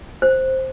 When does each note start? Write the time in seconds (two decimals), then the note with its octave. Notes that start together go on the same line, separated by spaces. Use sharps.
0.22 C5